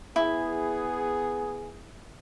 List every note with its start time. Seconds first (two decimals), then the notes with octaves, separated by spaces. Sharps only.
0.16 B3 E4 G#4